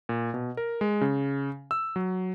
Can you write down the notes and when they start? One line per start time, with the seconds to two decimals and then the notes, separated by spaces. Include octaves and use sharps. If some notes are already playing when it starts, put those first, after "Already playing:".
0.09 A#2
0.34 B2
0.57 A#4
0.81 G#3
1.01 C#3
1.71 E6
1.96 F#3